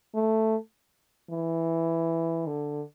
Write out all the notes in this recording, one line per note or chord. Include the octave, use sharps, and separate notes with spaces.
A3
E3
D3